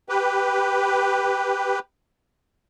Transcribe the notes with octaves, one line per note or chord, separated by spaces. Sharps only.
G4 B4